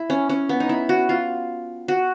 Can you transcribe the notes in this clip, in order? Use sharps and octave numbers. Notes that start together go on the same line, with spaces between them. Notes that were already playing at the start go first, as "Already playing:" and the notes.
Already playing: E4
C#4
C#4
B3
D#4
E4
F#4
F4
F#4